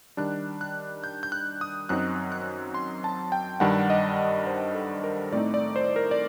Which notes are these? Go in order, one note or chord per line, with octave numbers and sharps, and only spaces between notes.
D#3 G3 D4 F#6
F#6
G6
G6
F#6
D#6
F#2 F#3 C4 D#4 F#6
F#6
C6
A5
G5
G2 D#3 G3 D4 F#5
D#5
C5
A4
A#4
A2 A3 C4 D#4 D5
D5
C5
A#4
D5